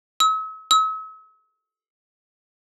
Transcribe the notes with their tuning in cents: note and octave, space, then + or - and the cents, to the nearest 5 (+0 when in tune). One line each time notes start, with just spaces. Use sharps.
E6 -45
E6 -45